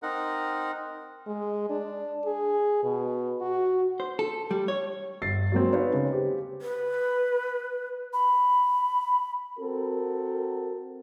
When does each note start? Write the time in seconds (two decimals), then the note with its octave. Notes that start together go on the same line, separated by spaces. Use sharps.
0.03 C4 D#4 A#4 F#5
1.27 G#3
1.70 D4
2.26 G#4
2.83 B2
3.41 F#4
4.00 C5
4.19 A4
4.51 G3
4.68 C#5
5.22 G1 A6 C7
5.52 F#3 G#3 A#3 C4
5.73 B3 C4 D#4 B4 C#5 F5
5.94 C#3
6.11 G4 C5
6.62 B4
8.13 B5
9.59 C4 F#4 A4 A#4